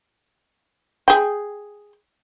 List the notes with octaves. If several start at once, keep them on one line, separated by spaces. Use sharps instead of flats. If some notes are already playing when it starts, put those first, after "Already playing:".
G#4 G5